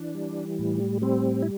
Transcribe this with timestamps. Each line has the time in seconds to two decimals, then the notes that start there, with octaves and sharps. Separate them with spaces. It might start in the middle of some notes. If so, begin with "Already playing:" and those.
Already playing: E3 D4
0.15 G3
0.59 A2
1.02 G3 C4
1.42 E4